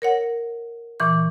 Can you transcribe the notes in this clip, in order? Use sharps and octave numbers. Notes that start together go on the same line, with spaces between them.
A#4 C#5 F#5
A#2 E3 C#6